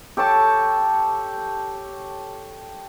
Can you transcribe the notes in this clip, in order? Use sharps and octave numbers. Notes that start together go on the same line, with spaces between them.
G4 A4 C#5 A5